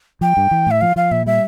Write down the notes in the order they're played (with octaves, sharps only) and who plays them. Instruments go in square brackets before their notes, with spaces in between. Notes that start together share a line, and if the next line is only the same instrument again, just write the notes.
[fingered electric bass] F3 [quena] G5
[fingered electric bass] G2
E3
[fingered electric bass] A2 [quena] E5
[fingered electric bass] F3 [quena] F5
[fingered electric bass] F3 [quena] F5
[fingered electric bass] A#2 [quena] E5
[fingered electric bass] G3 [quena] E5